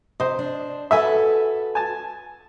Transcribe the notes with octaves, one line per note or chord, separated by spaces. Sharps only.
C3 C5 D#5
D4
F#4 A4 B4 E5 G#5
G#5 A5